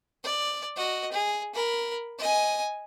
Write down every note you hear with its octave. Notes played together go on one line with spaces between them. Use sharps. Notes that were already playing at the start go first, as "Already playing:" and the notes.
D5
F#4 D#5
G#4
A#4 B5
D#5 G#5